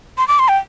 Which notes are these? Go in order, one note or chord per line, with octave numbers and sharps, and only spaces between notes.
C6
D6
C6
G5